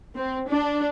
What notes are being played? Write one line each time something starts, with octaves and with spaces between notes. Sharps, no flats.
C4
D4